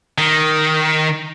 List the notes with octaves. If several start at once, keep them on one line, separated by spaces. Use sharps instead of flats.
D#3